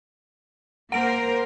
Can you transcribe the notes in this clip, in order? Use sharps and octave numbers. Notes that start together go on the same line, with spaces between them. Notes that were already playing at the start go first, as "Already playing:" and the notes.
A#3 A#4 C5 F#5 D7